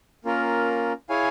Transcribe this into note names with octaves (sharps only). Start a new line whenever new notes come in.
A#3 C#4 F4 A#4
E4 G#4 C#5 F5 G#5